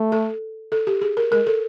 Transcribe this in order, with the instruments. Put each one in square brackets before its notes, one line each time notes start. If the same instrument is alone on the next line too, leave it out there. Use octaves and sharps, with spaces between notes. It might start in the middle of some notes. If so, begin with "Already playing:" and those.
Already playing: [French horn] A3
[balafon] A4
A4
G4
G#4
A#4
[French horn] G#3 [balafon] A#4
[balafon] A4